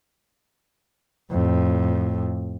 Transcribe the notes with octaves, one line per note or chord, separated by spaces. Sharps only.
F2 A2